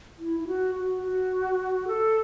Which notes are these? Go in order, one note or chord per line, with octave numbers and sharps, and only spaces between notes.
E4
E4
F#4
F#4
F#4
A4